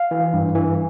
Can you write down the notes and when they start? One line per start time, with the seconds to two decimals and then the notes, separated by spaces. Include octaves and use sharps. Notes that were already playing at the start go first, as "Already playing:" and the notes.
Already playing: F5
0.11 E3
0.33 G2
0.55 E3